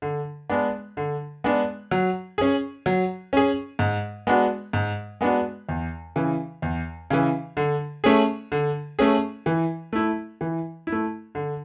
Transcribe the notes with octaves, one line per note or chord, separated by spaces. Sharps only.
D3
G#3 B3 D4
D3
G#3 B3 D4
F#3
C#4 G#4
F#3
C#4 G#4
G#2
G#3 B3 D4 F#4
G#2
G#3 B3 D4 F#4
E2
C#3 E3
E2
C#3 E3
D3
A3 C#4 G#4
D3
A3 C#4 G#4
E3
A3 E4
E3
E4
A3
D3